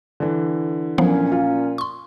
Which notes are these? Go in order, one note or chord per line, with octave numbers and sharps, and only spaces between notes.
D3 E3
A#2 F3 F#3 B3 C#4
F4
C6 C#6